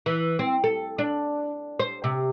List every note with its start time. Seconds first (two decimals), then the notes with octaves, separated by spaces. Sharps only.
0.06 E3
0.39 C4
0.64 A4
0.98 D4
1.80 C5
2.04 C3